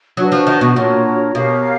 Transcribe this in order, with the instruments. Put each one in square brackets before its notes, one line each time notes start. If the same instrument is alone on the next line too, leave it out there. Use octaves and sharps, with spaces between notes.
[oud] F#3 [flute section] D4 F#4 B4
[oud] F3
D#3
B2
[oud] A#2 [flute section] D4 F#4 A#4 C#5
[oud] B2 [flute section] G4 A#4 C#5 F5